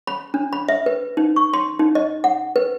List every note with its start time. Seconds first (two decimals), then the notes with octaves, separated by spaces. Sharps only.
0.07 B5
0.34 D4
0.53 B5
0.69 E5
0.86 B4
1.17 D#4
1.36 C#6
1.54 C6
1.79 D#4
1.95 D#5
2.24 F#5
2.56 B4